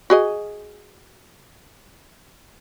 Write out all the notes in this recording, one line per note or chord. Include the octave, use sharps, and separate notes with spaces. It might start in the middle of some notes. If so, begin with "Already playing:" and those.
F#4 G#4 D#5